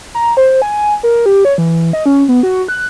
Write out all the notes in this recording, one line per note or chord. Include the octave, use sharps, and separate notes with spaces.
A#5
C5
G#5
A#4
G4
C#5
E3
D#5
C#4
B3
F#4
F#6